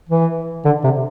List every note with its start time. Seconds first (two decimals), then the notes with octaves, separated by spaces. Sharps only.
0.09 E3
0.65 D3
0.84 C3